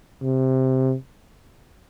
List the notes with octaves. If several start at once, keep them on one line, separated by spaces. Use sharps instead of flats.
C3